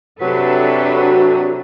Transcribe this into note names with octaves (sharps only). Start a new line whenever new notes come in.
C3 F#3 D4 F#4 A4 B4